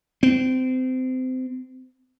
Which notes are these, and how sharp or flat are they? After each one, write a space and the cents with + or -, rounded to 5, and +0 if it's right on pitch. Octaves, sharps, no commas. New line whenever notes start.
C4 -25